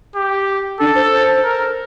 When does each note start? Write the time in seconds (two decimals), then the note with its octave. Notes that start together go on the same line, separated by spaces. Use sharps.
0.15 G4
0.80 D4 A4
0.95 C5
1.11 C5
1.44 A#4